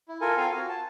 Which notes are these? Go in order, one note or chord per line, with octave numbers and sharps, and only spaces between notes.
E4
F4 A4 A#4 G#5
C4 F4 A4 F5 G#5
F4 F#4
A5